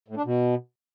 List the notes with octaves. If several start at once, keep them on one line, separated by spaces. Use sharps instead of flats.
A2
D4
B2